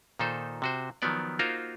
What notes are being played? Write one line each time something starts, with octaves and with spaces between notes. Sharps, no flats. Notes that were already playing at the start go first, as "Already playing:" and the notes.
A#2 D#3 D#4 A4 C5
C3 F#4 C5
D#3 F3 F#3 B3 D5
A#3 D#4 F4 F#4 A#4 C5